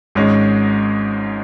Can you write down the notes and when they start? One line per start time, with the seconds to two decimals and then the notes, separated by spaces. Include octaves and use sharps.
0.15 G#1 G#2 G#3 C#4